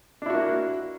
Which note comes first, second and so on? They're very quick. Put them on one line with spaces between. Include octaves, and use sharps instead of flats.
D4 E4 F#4 A#3